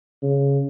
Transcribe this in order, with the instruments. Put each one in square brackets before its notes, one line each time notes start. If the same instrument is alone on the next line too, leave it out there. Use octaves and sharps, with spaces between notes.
[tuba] C#3